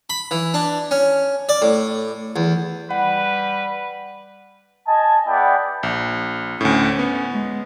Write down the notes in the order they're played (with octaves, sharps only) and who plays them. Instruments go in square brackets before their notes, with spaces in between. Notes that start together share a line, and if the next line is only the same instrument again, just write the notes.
[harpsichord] B5
E3
D4
C#4
D5
A2
E2
[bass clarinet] G3 [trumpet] B4 [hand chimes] F#5
[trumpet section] D#5 G#5 A5
B3 E4 G#4 D5 G5
[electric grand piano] A#1
[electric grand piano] D2 A2 [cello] C#4
[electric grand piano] B3
[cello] G#3